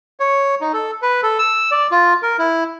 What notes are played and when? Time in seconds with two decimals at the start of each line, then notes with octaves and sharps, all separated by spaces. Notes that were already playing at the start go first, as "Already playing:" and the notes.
0.20 C#5
0.61 D#4
0.73 A4
1.02 B4
1.23 A4
1.39 E6
1.71 D5
1.91 F4
2.22 A#4
2.39 E4